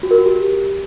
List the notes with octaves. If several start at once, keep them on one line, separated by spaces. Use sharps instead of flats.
F#4
A#4
F#4
G4